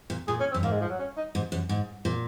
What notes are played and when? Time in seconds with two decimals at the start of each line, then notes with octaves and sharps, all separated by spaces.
0.10 A#2
0.28 A#2 G#4
0.40 C#4
0.51 C4
0.54 F#2
0.63 G#2 A#3
0.72 G#3
0.81 F3
0.89 F#3
0.99 C#4
1.17 D#4
1.35 G#2
1.52 F#2
1.69 G#2
2.05 A#2